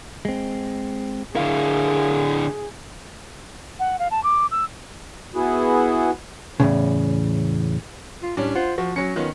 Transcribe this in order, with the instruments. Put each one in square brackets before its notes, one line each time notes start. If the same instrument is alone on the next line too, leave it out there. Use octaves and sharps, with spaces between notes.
[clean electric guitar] G#3 C4
[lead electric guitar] D3 E4 [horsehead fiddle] G#4 [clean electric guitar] A#4 F5
[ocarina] F#5
F5
A5
D6
E6
[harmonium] B3 E4 F#4 G#4
[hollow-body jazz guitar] E2 A2 C#3
[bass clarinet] F4
[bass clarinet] A2 [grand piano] G3 C#4 D4
[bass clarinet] F4 [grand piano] C5 F#5
[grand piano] F3 [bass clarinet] F#4
[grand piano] F#3 C#7 [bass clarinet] C#4
[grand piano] D#3 B3 C#4 [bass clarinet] F4